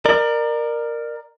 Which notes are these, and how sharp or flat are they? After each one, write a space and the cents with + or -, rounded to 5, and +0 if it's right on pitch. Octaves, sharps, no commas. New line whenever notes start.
A#4 +0 D5 +30